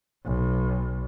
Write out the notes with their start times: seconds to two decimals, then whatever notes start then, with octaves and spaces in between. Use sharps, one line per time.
0.25 B1